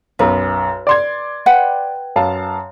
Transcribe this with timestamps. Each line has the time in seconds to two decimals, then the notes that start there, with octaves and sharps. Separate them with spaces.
0.19 B1 F#2 B4
0.87 D5 C6 G#6
1.46 B4 F#5 G5
2.16 F#2 F5 A5